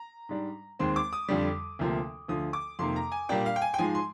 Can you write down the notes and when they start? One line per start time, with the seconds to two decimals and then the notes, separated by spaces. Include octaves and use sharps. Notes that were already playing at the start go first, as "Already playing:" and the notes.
Already playing: A#5
0.29 G#2 G3 D4
0.79 D#2 D#3 G#3 C4 C6
0.96 D6
1.13 D#6
1.28 F2 D3 G3
1.79 D2 C3 F3 A#3
2.28 D2 D3 F3 D#6
2.53 D6
2.79 F2 C3 D#3 A#3 C6
2.96 A#5
3.12 G#5
3.29 A#2 G3 A#3 D4 G5
3.46 F5
3.56 G5
3.62 G#5
3.74 G5
3.78 G#2 F3 G#3 G#5
3.95 C6